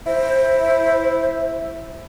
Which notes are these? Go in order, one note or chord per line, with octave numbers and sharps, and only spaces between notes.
E4 C5